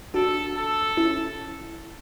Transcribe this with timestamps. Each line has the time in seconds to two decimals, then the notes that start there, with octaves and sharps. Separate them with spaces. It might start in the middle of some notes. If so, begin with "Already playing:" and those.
0.14 D4 F#4 A4
0.57 A4
0.97 C#4 E4